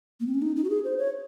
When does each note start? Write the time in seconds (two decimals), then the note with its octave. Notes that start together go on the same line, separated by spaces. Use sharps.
0.20 A#3
0.27 C4
0.35 C#4
0.42 D#4
0.56 D#4
0.64 F#4
0.70 G#4
0.85 C5
0.98 C#5